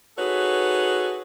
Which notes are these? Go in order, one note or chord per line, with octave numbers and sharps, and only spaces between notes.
D#4 F#4 G#4 A4 B4 C#5